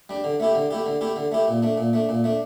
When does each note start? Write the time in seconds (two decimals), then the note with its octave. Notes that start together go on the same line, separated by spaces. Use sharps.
0.09 G3 D4
0.24 D3
0.40 A3 E4 G4
0.55 D3
0.71 A3 E4 G4
0.86 D3
1.01 A3 E4 G4
1.16 D3
1.32 A3 E4 G4
1.48 A#2
1.62 A3 D4
1.77 A#2
1.93 A3 D4
2.09 A#2
2.24 A3 D4